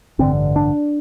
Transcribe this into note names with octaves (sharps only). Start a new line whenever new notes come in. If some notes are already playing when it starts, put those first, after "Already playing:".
A1 G2 D3 C4
D4